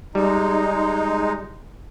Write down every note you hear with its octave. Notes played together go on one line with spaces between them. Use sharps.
G3 G#3 D#4